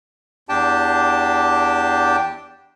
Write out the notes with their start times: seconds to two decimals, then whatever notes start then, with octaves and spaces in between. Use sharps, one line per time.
0.49 E2 D4 G4 G5 A5